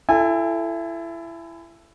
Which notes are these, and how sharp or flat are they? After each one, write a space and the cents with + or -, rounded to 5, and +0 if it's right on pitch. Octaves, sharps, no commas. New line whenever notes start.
E4 +25 A4 +0 G#5 -30